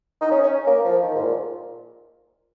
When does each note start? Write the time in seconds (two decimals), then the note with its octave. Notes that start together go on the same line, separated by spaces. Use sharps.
0.21 D#4
0.31 C#4
0.43 C#4
0.67 A#3
0.85 F3
1.02 D#3
1.15 G#2
1.20 A#2